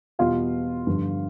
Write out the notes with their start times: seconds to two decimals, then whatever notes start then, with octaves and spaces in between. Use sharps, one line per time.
0.19 E2 B2 G3 F4 F5
0.87 G2 D3 F3